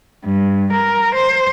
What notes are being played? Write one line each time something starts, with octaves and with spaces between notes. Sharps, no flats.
G2
A#4
C5